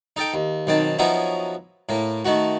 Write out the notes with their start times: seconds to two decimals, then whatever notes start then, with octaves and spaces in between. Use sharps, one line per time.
0.16 D#4 A4 G5
0.34 D#2
0.67 B1 D#3 C4 A5
0.99 F3 F#3 B3 C#4 D#4 E4
1.89 A2 A#3
2.25 D#3 A3 F#4